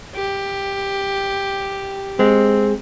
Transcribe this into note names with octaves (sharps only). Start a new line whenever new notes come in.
G4
G#3 C4